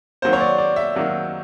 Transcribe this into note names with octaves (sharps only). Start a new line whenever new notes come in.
D#3 F#3 A#3 C5
C#5
D5
D5
E5
D#3 F#3 A#3